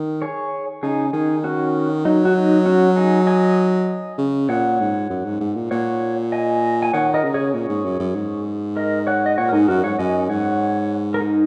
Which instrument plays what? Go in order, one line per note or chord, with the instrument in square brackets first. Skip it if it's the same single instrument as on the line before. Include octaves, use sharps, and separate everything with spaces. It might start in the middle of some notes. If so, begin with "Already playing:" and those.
Already playing: [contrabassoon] D#3
[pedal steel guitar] G#4 C#5
[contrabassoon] C#3 [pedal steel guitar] D#4 G#4
[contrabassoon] D#3 [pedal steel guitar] D#4 G#4
[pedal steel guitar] C#4 F#4
[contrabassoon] F#3 [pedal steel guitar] D#4
[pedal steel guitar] F#4
D#4
C#4 F#4
D#4 G#4
D#5 G#5
[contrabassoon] C#3
[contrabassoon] A#2 [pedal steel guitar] C#5 F#5
[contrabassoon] G#2
F#2
G#2
G#2
A#2
[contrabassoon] A#2 [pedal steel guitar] C#5 F#5
[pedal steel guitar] D#5 G#5
G#5
[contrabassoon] D#3 [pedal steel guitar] C#5 F#5
[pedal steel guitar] A#4 D#5
[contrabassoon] C#3
[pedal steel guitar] G#4 C#5
[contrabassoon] A#2 [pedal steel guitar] G#4 C#5
[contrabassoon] G#2
F#2
F#2
G#2
[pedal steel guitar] A#4 D#5
C#5 F#5
D#5
[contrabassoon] A#2 [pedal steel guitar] C#5 F#5
[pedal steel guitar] A#4
[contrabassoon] G#2 [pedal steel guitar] D#4 G#4
[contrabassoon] F#2 [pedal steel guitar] F#4 A#4
[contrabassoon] G#2 [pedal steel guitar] C#5 F#5
[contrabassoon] F#2 [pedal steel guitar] D#5 G#5
[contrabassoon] G#2 [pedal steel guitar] C#5 F#5
[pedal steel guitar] A#4
D#4 G#4